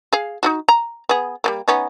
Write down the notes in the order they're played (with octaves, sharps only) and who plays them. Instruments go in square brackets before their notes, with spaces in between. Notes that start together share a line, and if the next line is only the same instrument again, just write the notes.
[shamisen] G#4 F5
D#4 F4 F#4
A#5
B3 G#4
G3 A3 A#3
B3 C#4 D#4